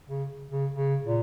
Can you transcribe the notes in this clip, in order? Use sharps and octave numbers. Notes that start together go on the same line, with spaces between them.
C#3
C#3
C#3
A#2